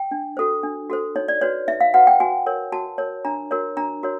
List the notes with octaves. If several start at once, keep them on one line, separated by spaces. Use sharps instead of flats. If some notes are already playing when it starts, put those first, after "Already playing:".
Already playing: G5
D4
F#4 A4 C5
D4
F#4 A4 C5
D#4 C#5
D5
F#4 B4 C#5
D#4 E5
F5
F#4 B4 F#5
G5
F#4 G#5
A#4 C#5
F#4 A5
A#4 C#5
D4 A#5
F#4 A#4 C#5
D4 A#5
F#4 A#4 C#5